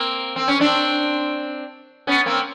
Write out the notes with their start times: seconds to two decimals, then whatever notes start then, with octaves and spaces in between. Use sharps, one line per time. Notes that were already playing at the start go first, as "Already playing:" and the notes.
Already playing: A#3 C4
0.36 C4
0.48 C#4
0.60 C4 D4
2.07 B3 C#4
2.26 A#3 C4